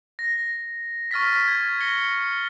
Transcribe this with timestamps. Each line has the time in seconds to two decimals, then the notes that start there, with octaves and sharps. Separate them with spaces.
0.19 A#6
1.11 C#6 F6 A6 B6
1.48 G#6
1.80 A#6 C#7 G7